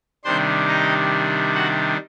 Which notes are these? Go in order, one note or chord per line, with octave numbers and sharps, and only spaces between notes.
C3 D#3 G3 D4 C5 C6
D#4 D#5
F#4 F#5